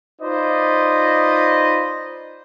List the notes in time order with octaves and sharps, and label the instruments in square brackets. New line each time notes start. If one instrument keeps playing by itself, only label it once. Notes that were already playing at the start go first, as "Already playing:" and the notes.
[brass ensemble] D#4 F4 B4 C5 D5 D#5